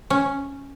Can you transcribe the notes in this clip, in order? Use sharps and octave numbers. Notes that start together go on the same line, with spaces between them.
C#4